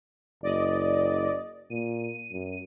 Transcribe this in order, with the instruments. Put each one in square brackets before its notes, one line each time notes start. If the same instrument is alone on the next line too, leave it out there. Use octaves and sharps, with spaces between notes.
[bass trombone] F#1 [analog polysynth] D5 D#5
[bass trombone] A#2 [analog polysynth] D#7
[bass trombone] F#2